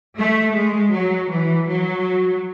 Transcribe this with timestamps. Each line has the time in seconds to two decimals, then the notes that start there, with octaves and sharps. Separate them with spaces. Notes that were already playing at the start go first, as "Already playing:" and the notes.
0.18 A3
0.55 G#3
0.93 F#3
1.31 E3
1.68 F#3